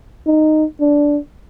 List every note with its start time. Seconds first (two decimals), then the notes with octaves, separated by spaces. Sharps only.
0.27 D#4
0.80 D4